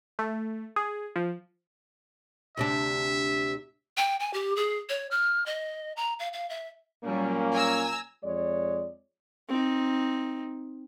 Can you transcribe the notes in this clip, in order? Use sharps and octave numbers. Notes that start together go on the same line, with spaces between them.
A3
G#4
F3
D2 C3 D4 E5
G5
G#5
G4
G#4
C#5
F6
D#5
A#5
F5
F5
E5
A#2 F#3 G3 A#3 C#4
G#5 A#5 E6
F2 G#3 C#5 D5
C4 D#4